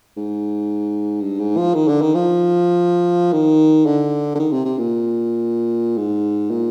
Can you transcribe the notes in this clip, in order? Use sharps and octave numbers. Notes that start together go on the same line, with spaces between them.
G#2
G2
G#2
F3
D#3
D3
D#3
F3
D#3
D3
D3
D#3
C3
C3
A#2
G#2
A#2